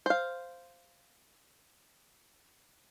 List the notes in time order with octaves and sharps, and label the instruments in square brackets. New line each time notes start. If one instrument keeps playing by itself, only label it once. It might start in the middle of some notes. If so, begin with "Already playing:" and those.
[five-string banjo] C5 F5